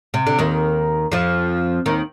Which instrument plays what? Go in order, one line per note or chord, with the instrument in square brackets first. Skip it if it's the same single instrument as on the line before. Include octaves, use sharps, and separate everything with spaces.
[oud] C3
D3
D#2 D#3
F2 F3
D#2 D#3